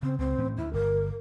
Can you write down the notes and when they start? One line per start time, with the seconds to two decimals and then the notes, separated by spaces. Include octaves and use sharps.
0.03 C#3 C4
0.19 C#2 C4
0.38 A2 E3 C#4
0.57 D2 E4
0.73 G1 A#4